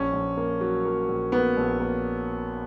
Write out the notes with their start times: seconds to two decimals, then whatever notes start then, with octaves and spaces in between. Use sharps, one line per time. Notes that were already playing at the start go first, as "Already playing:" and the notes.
Already playing: A#1 C#4
0.13 A#1
0.37 A#3
0.61 F#3
0.85 A#3
1.08 A#1
1.32 A#3 B3
1.57 A#1
1.80 A#3